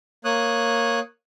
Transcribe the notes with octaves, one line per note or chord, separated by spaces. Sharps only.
A#3 C#5 D#6 F#6